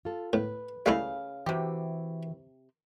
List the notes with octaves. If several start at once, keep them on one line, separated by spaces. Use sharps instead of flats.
F4 A4
A2 B4
C#3 G3 A3 E4 F5
C3 E3 F#4 G4 G5